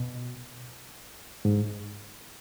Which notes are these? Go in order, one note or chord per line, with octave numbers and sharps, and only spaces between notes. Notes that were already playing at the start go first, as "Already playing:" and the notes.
Already playing: B2
G#2